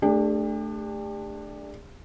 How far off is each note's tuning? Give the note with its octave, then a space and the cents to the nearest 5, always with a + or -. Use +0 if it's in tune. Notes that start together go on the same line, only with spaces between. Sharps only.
A3 +0 D4 +10 G4 +40